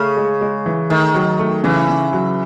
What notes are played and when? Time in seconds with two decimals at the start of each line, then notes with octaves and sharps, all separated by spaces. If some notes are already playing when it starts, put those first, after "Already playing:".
Already playing: C#3 A3
0.17 G#3
0.41 G#3
0.66 E3
0.90 D#3 A3
1.14 F#3
1.39 A3
1.64 C#3 E3
1.89 C#3
2.13 F#3